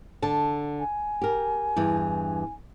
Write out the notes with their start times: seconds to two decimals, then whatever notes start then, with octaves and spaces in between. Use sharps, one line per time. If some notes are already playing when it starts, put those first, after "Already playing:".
0.22 D3 A5
0.80 G#5
1.22 G4 A#4
1.76 E2 G2 E3